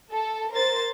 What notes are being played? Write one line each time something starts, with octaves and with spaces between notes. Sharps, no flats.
A4
A#4 C5 A6